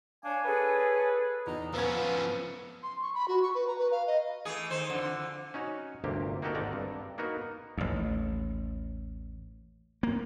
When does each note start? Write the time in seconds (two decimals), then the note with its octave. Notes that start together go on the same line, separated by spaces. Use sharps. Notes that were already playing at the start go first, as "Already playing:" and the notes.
0.24 D4 C#5 F5 G#5
0.45 G#4 A4 B4 C#5
1.47 E2 D#4
1.74 F3 B3 C#4 E6 G#6
1.93 F4 E7
2.83 C6
3.02 C#6
3.14 B5
3.28 F#4
3.42 C#6
3.55 B4
3.67 A#5
3.78 B4
3.91 F5
4.07 D#5
4.45 E3 A3 G#4
4.70 D#3 D#4 C5
4.90 F2 D3 E3
5.54 C#4 D#4 F#4 C#5
6.04 G1 D2 C3 A#3 G4
6.42 A#3 D#4 F#4 G4 A4 A#4
6.55 G#1 D3 D#3 D5 A#5
6.73 G2
7.18 A#3 B3 D#4 F#4 A#4
7.77 A1 D#2
10.03 A#3